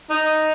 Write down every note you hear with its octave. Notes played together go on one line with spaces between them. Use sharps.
D#4